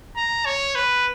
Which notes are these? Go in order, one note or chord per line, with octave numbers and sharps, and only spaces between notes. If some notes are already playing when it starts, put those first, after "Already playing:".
A#5
C#5
B4